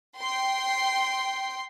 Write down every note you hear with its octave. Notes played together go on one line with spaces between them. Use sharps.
G5 C6